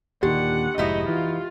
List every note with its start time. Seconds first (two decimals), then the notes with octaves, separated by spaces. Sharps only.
0.23 D#2 A#2 D3 D#3 G4 F#5
0.78 F1 G#2 D#4 E4 F#4 D#5
1.08 E3 F4